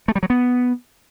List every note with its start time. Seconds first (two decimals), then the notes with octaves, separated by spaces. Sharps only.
0.08 A3
0.15 G3
0.23 F#3
0.30 B3